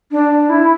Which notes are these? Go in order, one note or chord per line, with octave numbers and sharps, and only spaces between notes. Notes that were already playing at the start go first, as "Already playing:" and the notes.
D4
E4